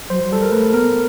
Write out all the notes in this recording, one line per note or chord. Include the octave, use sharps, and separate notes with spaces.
F#3 C5
F#3
G3 A4
A#4
A3 B4
B3 A#4